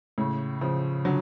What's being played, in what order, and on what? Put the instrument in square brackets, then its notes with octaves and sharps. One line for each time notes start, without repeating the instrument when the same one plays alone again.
[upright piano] A2 C#3
C#3 F3
D3 F#3